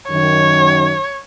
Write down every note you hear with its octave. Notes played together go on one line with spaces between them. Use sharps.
F#2 D#3 C#5